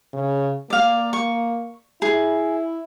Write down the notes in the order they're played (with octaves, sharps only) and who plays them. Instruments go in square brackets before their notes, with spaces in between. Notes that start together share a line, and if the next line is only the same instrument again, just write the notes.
[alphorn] C#3
[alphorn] A#3 [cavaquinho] D5 F5
[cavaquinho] C#6
[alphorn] E4 [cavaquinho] G#4